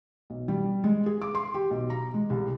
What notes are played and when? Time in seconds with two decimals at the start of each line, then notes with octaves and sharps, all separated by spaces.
0.30 B1
0.48 G3
0.84 G#3
1.06 G#4
1.22 D6
1.35 C6
1.54 G4
1.71 B1
1.90 A#5
2.14 G#3
2.30 C2